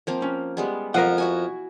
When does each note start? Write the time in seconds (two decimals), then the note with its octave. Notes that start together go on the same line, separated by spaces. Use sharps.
0.07 F3 A#3 C4
0.22 C#4
0.57 G3 G#3 B3
0.94 F2 A#4 D#5 F#5
1.18 E4 F#4 G#5